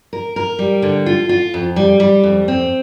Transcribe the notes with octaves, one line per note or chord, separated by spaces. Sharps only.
A#4
A#4
G3
D3
F4
F4
F2
G3
G3
F2
C4